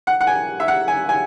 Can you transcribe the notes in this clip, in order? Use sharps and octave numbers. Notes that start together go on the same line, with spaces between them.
F#5
F#5
G#5
E5
F#5
G#5
G#5